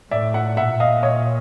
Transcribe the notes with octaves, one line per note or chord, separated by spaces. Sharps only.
A2 D5 E5
E5 F#5
A#2 E5 F#5
D#5 F5
C#5 D#5